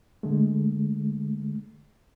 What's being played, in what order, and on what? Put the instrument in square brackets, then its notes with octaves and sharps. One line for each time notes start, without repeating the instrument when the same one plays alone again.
[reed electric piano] D3 G#3 A3